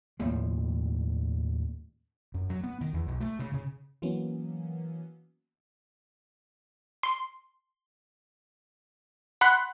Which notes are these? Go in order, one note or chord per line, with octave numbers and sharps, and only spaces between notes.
D#2 A2 C#3 F3
F#2
F#3
B3
D#3
E2
B1
A3
C#3
C#3
E3 F#3 A#3 B3 C#4
C6
F#5 B5 C6 F#6